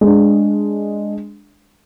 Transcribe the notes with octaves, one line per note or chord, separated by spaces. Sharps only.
G#3 D4